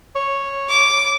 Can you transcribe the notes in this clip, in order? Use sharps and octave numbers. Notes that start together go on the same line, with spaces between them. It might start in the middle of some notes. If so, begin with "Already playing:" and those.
C#5
D6